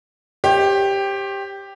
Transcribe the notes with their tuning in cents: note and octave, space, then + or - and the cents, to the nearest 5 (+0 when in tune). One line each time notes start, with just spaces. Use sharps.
G4 +5 C5 +45